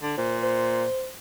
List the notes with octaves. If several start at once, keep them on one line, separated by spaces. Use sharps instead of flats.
D3
A#2 C5
C5